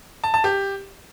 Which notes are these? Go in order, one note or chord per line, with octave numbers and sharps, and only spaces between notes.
A5
A5
G4